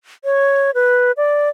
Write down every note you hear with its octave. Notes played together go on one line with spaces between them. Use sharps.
C#5
B4
D5